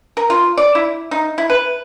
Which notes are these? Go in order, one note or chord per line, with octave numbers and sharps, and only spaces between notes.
A#4
F4
D5
E4
D#4
E4
B4